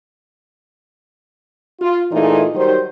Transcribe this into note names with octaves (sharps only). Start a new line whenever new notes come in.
F4
A#2 E3 A3 D#4 F4 G#4
D#3 F#3 G3 D#4 C5